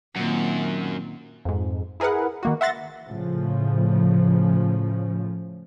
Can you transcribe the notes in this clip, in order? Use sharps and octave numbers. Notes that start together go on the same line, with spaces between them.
F#2 A#2 D#3 C4
F2 G#2
E4 G#4 A#4 B4 F#5
D#3 A#3 F#4
E5 F#5 C6 A6 A#6
A2 C#3 F3